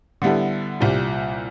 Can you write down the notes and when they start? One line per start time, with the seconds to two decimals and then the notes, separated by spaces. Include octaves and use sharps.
0.22 D3 G3 B3 E4 A4
0.80 C2 A#2 G3